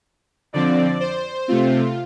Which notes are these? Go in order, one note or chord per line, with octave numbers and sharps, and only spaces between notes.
F2 D3 F3 C4 D5
C5
C3 A3 C4 F4